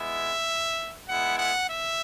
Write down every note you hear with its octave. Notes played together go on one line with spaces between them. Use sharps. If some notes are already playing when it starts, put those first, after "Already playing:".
Already playing: G#3 B3 E4 E5
G#3 B3 E4 F#5
F#5
E5